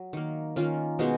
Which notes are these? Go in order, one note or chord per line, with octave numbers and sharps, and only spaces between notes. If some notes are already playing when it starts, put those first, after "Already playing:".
Already playing: F#3
D#3 A#3
D#3 A#3 C#4 F4
B2 G#3 B3 D#4 F#4